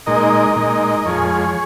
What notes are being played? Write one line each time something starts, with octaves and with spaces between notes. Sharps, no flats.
A#2 G#3 D#4 A#4 D#5
A#2 G#3 D#4
F2 F3 G#3 G#4 C#5